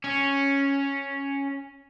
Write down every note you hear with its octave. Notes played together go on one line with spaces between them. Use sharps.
C#4